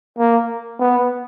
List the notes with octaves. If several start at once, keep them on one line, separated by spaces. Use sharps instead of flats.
A#3
B3